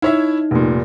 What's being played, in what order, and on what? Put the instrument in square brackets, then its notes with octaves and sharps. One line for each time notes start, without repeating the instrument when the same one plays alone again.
[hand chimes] D#4 [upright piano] E4 C#5 E5
[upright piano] F1 A#2